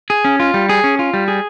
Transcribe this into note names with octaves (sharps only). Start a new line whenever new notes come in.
G#4
C#4
F4
G3
G#4
C#4
F4
G3
G#4